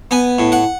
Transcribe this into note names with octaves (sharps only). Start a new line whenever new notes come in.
B3 G#5
A2
F#5